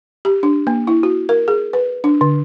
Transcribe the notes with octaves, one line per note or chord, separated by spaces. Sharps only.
G4
D4
A#3
E4
F#4
A#4
G#4
B4
D4
D3